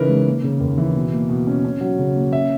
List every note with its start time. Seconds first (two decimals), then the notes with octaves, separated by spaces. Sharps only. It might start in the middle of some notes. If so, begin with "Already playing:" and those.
Already playing: C#3 E3 D#4 A#4 B4
0.09 G#3
0.26 A#3
0.44 C#3
0.61 D#2
0.78 E3
0.96 B2
1.13 A#3
1.30 B2
1.47 C#4
1.65 C#4
1.81 F#3
1.99 C#3
2.15 A#3
2.32 C#4 E5